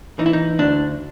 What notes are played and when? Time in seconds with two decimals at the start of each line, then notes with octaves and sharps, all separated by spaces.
0.19 E3 D#4
0.26 E4
0.33 D#4
0.59 D2 D4